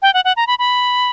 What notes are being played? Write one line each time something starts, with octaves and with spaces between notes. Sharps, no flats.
G5
F#5
F#5
A#5
B5
B5